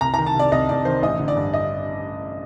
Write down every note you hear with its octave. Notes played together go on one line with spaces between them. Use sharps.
C2 A#5
D#3 A#5
A5
C3 D5
C2 D#5
C2 D5
D#3 C5
A1 D#5
D3
D5
G2
D#5